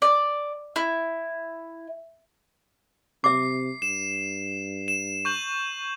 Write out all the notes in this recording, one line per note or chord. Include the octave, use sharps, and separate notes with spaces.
D5
E4
C3 E5 D6 C7
G2 E7
E7
C#6 G6 F#7